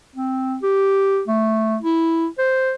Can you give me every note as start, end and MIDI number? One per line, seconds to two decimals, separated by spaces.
0.16 0.57 60
0.63 1.22 67
1.28 1.78 57
1.83 2.27 64
2.39 2.73 72